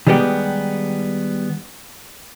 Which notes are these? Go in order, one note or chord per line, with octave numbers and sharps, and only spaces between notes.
D#3 G3 G#3 B3 G4